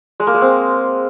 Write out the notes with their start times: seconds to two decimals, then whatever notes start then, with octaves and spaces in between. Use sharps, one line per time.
0.20 G#3
0.27 A#3
0.34 G#3
0.42 C4